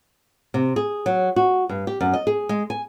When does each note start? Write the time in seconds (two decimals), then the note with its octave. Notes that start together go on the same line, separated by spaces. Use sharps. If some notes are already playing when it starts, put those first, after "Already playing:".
0.54 C3
0.76 G#4
1.06 F#3
1.36 F#4
1.69 G2
1.87 G4
2.01 F#2
2.13 D#5
2.27 G#4
2.49 G#3
2.70 G#5